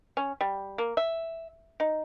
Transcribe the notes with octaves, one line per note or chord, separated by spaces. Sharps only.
C#4
G3
A#3
E5
D#4